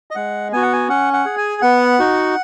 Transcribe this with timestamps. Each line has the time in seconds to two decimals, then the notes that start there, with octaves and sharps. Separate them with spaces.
0.11 D#5
0.15 G#3 F#5
0.52 B3 F#4 G#5
0.63 F#5
0.73 G#5
0.89 C#4 F#5
1.14 F#5
1.25 G#4
1.38 G#5
1.62 B3 F#5
1.99 D#4 F#4